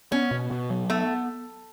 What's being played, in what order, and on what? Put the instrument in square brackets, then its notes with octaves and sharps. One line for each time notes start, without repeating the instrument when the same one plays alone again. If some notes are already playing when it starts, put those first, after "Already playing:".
[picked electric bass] B3 [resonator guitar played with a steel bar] C#4
[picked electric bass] B2
B2
F#3
[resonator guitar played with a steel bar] A3 [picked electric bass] B3